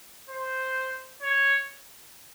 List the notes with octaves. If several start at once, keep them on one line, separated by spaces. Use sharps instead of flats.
C5
C#5